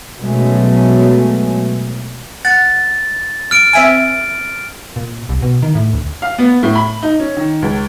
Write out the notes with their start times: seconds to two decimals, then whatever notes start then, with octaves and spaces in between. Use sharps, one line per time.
0.21 B2 F#3 G#3 A3 B3 C#4
2.45 F#5 A6
3.51 F6 D7
3.73 C4 E5 G#5
4.96 A#2
5.29 C2
5.42 B2
5.63 D#3
5.75 A2
5.93 D2
6.22 F5
6.38 B3
6.63 A2
6.75 B5
7.02 D#4
7.20 C#4
7.37 D#3
7.62 C#2